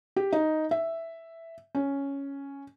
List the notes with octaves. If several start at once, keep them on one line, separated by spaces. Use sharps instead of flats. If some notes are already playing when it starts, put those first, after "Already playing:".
G4
D#4
E5
C#4